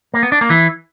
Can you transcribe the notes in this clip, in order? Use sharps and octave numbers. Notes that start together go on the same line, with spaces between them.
A#3
B3
D4
A#3
E3